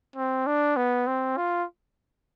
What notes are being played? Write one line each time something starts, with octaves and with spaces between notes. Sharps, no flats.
C4
D4
B3
C4
F4